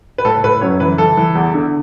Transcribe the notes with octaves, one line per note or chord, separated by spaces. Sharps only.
B4
A2 A4
A2 B4
F#2 C#5
E3 B4
E3 A4
E3
E2
D3